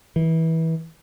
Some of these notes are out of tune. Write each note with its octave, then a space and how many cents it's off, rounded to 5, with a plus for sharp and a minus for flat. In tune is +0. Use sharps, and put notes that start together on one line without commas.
E3 -25